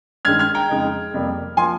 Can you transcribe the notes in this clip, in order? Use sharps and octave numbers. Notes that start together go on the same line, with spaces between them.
G2 D#3 G#3 C#4 F6 G#6
F6 G#6
G5 A#5
F2 C#3 G#3 D#4
F2 C3 G3 A#3
F3 A#3 G#5 C6